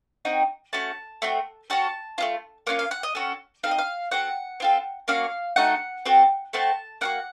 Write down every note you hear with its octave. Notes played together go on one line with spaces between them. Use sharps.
C4 D#4 F#4
A3 C#4 F#4 A5
A3 C4 F#4
C#4 F#4 A4 A5
A3 C#4 F4
A#3 C#4 F4 F#5
F5
F#5
D#5
C#4 F#4 A4
C4 D#4 A4 F5
D#5
F5
C4 F#4 A4 F#5
C4 F4 A4
A#3 C#4 F#4 F5
A3 D#4 F#4 A4 F#5
C4 F#4 A4
A3 C4 F#4 A5
A#3 D#4 F#4 F#5